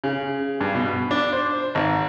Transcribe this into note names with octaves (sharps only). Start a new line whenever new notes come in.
C#3
G2
B2
D4
C5
G#1